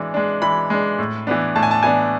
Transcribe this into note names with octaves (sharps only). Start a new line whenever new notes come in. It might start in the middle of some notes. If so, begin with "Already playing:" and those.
Already playing: E3 G#3 D4
G#3 D4
E3 B5
G#3 D4
A2
E3 B3 D4
A2 A5
G#5
A5
E3 B3 D4 G#5